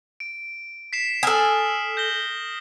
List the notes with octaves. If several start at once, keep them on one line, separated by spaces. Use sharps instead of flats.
D7
B6 C7 E7
A4 G#5 D#6 F6
G6 A#6 G7